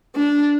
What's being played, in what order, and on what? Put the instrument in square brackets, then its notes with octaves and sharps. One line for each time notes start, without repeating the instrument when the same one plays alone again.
[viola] D4